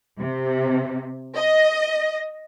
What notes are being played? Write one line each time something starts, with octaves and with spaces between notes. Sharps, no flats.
C3
D#5